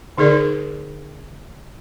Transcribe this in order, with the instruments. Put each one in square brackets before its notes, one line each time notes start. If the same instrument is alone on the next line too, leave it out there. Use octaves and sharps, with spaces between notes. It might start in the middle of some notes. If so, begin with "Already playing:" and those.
[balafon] D3 D#4 G#4 A#4 D5